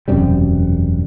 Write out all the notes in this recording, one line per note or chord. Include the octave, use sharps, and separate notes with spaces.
E1 F#2 C3 G3